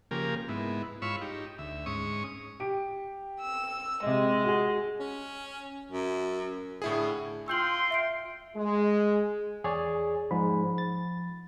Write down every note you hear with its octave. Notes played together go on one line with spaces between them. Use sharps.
C#3 F3 A#3 G4 A#4 G#5
G#2 B3 E4
G#2 F4 C#5 B5 C#6 E6
D#4 G4
D2 E5
G#2 C#4 C#6 D#6
G4 D7
E6
C3 G#3 D#5
F#4 G#4
C#4
F#2
A2 D3 E4 G#4
F4 G5 C6 E6 G6 F#7
E5 C7 D7
G#3
E2 G#4 C#5 D5 G#5
G#2 F3 B5
A6